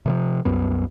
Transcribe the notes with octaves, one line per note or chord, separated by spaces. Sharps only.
C3 D#3 F3
C2 F#2 B3